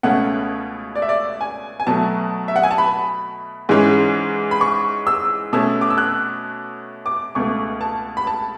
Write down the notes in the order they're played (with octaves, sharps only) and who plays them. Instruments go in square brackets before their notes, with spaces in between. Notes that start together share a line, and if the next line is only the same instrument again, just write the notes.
[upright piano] C#2 B2 A3 C#4 F#5
D5
E5
D5
G#5
G#5
B2 F#3 A3 A5
E5
F#5
G#5
A5
B5
G#2 E3 G#3 C#4
B5
C#6
E6
B2 A3 C#4 E6
D6
E6
F#6
D6
C#2 B2 A3 C#6
A5
B5
A5